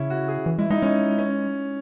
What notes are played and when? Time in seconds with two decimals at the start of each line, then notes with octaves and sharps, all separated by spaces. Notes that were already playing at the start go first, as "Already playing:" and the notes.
Already playing: C#3 C#4 E4
0.10 F#4
0.28 G#4
0.46 E3
0.59 G#3 E4
0.70 G#3 D#4
0.82 G#3 C#4
1.18 C#4